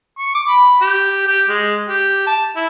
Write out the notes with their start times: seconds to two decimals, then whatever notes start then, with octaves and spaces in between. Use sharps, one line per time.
0.19 C#6
0.35 D6
0.48 B5
0.81 G4
1.26 G4
1.49 G#3
1.89 G4
2.27 A5
2.56 E4